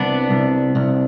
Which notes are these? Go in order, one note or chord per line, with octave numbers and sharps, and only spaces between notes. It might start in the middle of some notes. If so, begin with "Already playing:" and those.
Already playing: C2 B3 D4
C2
C2